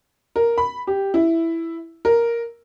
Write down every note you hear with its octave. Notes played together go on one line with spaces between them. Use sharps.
A#4
B5
G4
E4
A#4